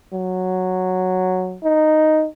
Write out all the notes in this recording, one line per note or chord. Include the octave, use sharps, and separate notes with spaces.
F#3
D#4